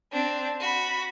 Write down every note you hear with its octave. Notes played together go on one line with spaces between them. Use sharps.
C4 D4
F#4 B5